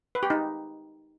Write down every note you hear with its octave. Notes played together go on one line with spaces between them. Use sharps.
B4
G4
D#4